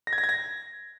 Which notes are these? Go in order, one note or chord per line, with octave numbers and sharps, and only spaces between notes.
A#6
G#6
A#6
G#6
A#6